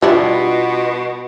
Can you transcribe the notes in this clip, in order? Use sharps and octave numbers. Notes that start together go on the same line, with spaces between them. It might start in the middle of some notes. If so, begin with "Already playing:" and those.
B2 G3 D4 E4 F4 D#5 E5